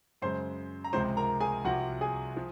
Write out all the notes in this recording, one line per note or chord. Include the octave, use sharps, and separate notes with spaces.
F#2 C#3 G#3 C5 C6
A#5
C#2 C3 F3 G#3 C5 C6
A#4 A#5
G#4 G#5
C2 C3 F3 F#4 F#5
G#4 G#5
F3